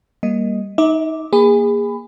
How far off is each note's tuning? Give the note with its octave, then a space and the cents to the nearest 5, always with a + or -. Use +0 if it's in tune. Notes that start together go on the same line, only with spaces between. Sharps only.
G3 +5 A#3 +0 D#5 +0
D#4 +15 E5 -40 D6 +0
A#3 +10 G#4 -25 B5 +20